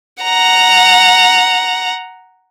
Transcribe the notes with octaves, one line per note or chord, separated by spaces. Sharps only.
F#5 A#5